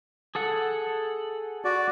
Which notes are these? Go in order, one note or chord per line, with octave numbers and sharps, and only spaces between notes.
G#4 A4 F#5
F#4 D5